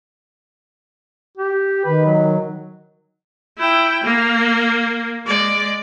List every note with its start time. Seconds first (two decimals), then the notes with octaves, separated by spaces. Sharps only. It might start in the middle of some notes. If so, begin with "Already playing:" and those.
1.37 G4
1.85 D#3 B4
2.05 F#3
3.58 E4 G5
4.03 A#3
5.26 G#3 D5